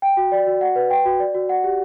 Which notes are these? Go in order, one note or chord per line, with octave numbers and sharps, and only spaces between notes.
G5
F#4
D5
F#4
F#5
B4
G5
F#4
D5
F#4
F#5
G4